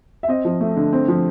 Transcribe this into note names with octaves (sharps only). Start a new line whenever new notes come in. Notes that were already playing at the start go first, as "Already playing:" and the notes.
E5
C4 D#5
F3
A3
D3
C4
F3